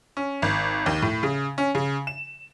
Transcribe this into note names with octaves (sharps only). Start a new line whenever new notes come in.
C#4
G#1
D#2
A2
C#3
C#4
C#3
E7